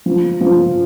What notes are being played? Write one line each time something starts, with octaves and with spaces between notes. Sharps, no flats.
F3
F3